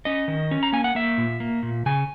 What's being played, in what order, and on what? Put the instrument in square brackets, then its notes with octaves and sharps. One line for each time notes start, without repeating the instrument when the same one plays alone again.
[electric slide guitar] C#4 D#5
D#3
C#4
A#5
A#3 G#5
F#5
A#3 E5
A#2
A#3
A#2
C#3 G#5